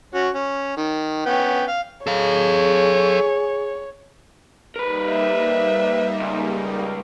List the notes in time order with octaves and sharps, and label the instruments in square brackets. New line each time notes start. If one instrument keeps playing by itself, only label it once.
[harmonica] C#4 F#4
C#4
D#3
B3 C#4 G5
F5
[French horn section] G#4 [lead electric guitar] A4 F5 [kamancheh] C#5
[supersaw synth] G3 A#3 D#4 [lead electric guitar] A#4 B4
[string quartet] E5
[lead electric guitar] C#2